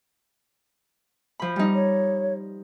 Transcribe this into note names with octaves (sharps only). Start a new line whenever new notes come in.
F3 B5
G3 D#4
C#5